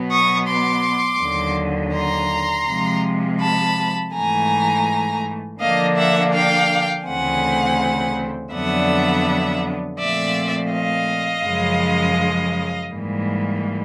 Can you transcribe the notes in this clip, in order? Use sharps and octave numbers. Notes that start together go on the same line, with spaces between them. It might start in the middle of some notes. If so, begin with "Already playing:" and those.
Already playing: B2 F#3 B3
C#6 D#6
C6 D6
D#2 D3 F#3
A#5 C6
C3 F3 G#3
A5 B5
G#2 E3 A3 G#5 A#5
D3 F3 A#3 D4 D#5 F5
E5 F#5
F5 G5
D2 C#3 E3 A3 C4 F#5 G#5
F2 D3 F#3 B3 D4 E5 F#5
A#2 F3 A3 C4 D5 E5
D#5 F5
F#2 C#3 F3 G#3
G#2 E3 G3 A#3